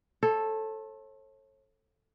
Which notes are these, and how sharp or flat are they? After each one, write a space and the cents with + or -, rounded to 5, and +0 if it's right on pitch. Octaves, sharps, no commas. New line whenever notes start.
A4 +0 C#5 -40